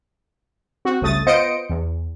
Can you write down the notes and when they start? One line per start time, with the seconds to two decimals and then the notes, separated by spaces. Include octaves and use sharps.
0.85 C4 F#4
1.01 G1 C#2 A3 D#6 A6
1.27 B3 F4 C5 D#5 C#7 D7
1.69 E2